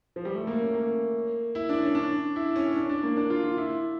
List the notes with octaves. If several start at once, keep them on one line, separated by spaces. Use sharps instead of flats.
F3
G3
A3
A#3
C#4
A#3
E4
D4
C#4
D4
E4
C#4
D4
D4
A#3
D4
F4
F4
E4